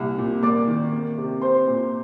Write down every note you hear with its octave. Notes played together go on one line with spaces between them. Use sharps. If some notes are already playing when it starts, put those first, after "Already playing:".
Already playing: C2 A#2
A#2
A#3 D5 D6
D#3
A#3
C3
C4 C5 C6
A#2